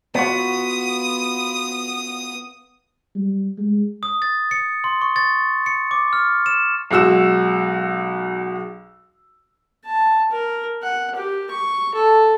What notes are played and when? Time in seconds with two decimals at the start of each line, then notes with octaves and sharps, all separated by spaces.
0.15 B3 F4 F#4 D#6
3.15 G3
3.58 G#3
4.03 D#6
4.22 A6
4.51 C#7
4.84 C6
5.02 C#6
5.16 A6
5.66 C#7
5.91 D6
6.13 F6
6.46 E7
6.91 B1 G#3 F#4 E6 E7
9.85 A5
10.31 A#4
10.83 F#5
11.16 G4
11.51 C#6
11.95 A4